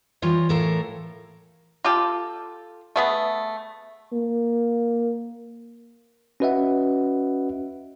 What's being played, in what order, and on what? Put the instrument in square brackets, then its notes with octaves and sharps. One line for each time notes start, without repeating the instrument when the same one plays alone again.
[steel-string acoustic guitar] E3 G3 F4 C#5 D#5
A2 E3 A4 A#4 C#5 F5
[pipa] F4 G4 A4
A3 B3 G#4
[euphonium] A#3
[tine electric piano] C#4 F#4 B4 D#5 E5 F#5